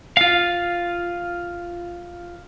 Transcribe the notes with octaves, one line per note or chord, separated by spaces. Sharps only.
F4 F5